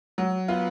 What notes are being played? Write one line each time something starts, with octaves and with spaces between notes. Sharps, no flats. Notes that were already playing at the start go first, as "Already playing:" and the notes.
F#3
B3 F4